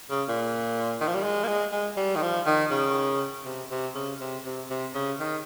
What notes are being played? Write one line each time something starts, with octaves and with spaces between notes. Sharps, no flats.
C#3
A#2
D#3
F3
G3
G#3
A#3
G#3
G#3
G3
D#3
F3
D#3
C#3
C3
C3
C#3
C3
C3
C3
C#3
D#3